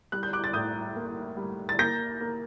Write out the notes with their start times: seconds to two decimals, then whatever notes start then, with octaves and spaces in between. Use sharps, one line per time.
0.12 G3 F#6
0.23 G6
0.33 D6 F#6
0.44 A6
0.53 A2 D#6 G6
0.96 A#3
1.37 G3
1.69 A6
1.79 A#3 G6 A#6
2.21 A#3